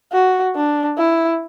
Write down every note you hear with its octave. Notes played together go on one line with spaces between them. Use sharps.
F#4
D4
E4